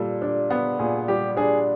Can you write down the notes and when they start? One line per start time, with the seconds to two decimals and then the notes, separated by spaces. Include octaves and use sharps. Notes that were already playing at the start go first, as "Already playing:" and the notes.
Already playing: A#2 G3 A4
0.22 D4
0.51 B3
0.79 A#2 G#4
1.08 G3 G4
1.37 D4 G#4